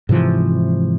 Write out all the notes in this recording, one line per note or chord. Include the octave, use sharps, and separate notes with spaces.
G#2 C3 E3 F3